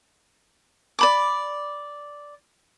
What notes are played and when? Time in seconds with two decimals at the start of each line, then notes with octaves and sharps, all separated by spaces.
0.99 D5 B5 D6